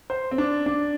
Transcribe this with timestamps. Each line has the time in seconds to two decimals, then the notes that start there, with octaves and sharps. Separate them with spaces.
0.10 C5
0.31 C4
0.38 D4
0.66 D4